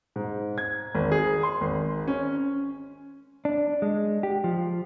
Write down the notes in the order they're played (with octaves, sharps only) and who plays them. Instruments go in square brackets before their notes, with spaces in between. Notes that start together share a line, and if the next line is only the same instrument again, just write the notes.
[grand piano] G#2
G#6
G#1
G#4
C6
G#1
C#4
[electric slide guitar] D4
G#3
G4
F3